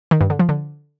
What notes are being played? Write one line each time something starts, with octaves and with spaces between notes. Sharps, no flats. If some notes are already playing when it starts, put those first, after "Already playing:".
D#3
G2
D3
F3
D3